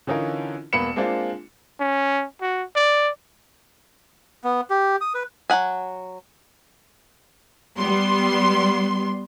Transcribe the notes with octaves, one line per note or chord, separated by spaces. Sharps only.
D3 E3 C#4 D#4 F4 A#4
E1 A#3 B3 B5 C#7 E7
G#3 A#3 C4 D4 F4
C#4
F#4
D5
B3
G4
D#6
B4
F#3 E4 F#5 G#5
G3 B3 C6